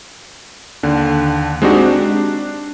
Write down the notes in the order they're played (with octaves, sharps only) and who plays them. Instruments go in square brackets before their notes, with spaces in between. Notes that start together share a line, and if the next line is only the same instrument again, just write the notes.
[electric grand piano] D#2 D3
G#3 C4 D4 D#4 F#4 G4
D4